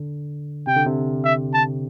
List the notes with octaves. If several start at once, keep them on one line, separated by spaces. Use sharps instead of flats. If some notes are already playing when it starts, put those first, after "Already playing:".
Already playing: D3
C3 G5
D3
C3
E5
A5